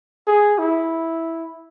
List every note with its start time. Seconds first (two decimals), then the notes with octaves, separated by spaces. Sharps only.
0.27 G#4
0.59 E4